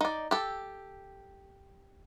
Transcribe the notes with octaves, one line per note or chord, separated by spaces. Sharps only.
D#4 D5
G4 A4